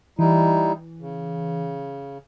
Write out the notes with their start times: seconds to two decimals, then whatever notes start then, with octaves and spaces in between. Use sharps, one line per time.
0.19 E3 G3 D#4 E4
1.00 C#3